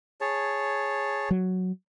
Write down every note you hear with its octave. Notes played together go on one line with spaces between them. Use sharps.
G#4 C#5 A5
F#3